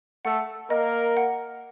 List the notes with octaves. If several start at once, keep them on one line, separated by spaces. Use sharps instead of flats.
A3 A4 F#5
A#3 A#4 D#5
F#5